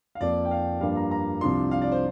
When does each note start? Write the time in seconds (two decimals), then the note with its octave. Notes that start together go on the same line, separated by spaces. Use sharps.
0.15 F5
0.21 F2 F3 A#3 D5
0.45 G5
0.51 F5
0.81 G2 F3 A#3 D4 F5
0.96 A#5
1.11 A#5
1.41 C2 C3 F3 D4 C6
1.71 F5
1.82 D5
1.92 C5